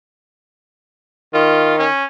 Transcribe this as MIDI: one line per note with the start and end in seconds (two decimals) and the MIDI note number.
1.34 1.85 51
1.34 1.77 65
1.78 2.05 61